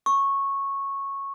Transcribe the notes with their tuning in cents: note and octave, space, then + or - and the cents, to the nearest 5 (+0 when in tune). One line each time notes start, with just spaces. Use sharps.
C#6 -10